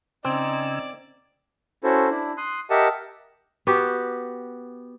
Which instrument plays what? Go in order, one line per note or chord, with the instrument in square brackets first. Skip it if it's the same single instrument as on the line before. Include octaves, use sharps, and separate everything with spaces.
[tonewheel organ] C#3 G#5 E6 [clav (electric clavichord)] C4 [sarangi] D#4 [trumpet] D5
[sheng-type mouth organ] C#4 E4 F#4 A4 C5
D4 E4
C6 D#6 F#6
G4 A#4 D#5 E5 F#5 A5
[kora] B3 F#4 G4